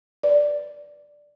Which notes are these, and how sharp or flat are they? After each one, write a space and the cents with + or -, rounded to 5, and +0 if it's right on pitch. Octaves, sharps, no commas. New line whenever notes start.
B4 +0 D5 +0